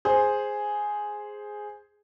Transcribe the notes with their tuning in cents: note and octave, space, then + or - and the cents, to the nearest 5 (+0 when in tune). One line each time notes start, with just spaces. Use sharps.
G#4 +0 C5 +0